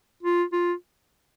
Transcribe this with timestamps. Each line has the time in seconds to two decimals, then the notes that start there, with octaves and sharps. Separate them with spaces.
0.23 F4
0.53 F4